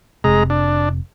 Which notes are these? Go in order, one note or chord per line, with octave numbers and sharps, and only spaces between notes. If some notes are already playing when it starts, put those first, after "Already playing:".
F1 C3 G#3 A#5
D4